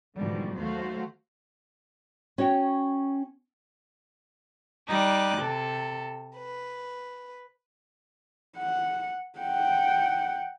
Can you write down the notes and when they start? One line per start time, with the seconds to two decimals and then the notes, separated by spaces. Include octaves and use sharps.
0.18 G#2 B2 D3 E3 F3 G3
0.57 D#2 F#3 A3 F#4 C5 F5
2.38 C#4 F#4 C#5 G5
4.89 G3 D#4 D6 F#6
5.39 C3 A4
6.36 B4
8.58 F#5
9.39 F#5 G5